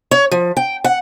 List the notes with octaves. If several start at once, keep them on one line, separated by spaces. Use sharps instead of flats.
C#5
F3
G5
F#5